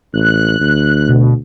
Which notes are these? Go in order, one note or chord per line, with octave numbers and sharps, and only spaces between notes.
A1 F#6
D2
B2